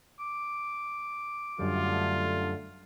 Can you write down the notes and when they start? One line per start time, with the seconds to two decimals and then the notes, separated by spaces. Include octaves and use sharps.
0.19 D6
1.59 F#2 D3 G3 A3 F4